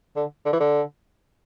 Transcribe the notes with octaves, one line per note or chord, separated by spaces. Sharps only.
D3
D3
E3
D3